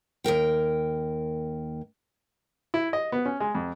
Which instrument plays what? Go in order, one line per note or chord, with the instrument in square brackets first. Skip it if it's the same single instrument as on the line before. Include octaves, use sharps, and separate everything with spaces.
[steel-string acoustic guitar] D#2 C#3 A#4 G5
[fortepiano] E4
D#5
B3
C#4
G#3
F2